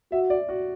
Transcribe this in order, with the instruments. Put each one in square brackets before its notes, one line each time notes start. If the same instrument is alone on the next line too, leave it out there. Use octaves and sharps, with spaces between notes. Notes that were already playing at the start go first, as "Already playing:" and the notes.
[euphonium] F#4 [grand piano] E5
[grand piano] D5
F#4